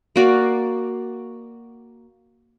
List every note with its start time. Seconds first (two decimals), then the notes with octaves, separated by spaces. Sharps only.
0.16 A#3 F#4 D5 F5